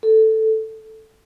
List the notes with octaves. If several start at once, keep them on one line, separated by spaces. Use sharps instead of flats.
A4